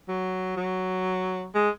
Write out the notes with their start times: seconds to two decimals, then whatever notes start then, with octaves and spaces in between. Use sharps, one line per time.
0.08 F#3
0.57 F#3
1.55 G#3